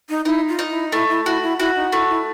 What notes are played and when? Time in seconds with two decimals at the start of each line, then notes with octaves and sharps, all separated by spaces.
0.09 D#4
0.25 D#4 E4
0.48 F4
0.59 D#4
0.70 E4
0.92 A3 E4
1.09 E4
1.26 E4 F#4
1.42 E4
1.59 E4 F#4
1.76 D#4
1.92 A3 E4
2.09 E4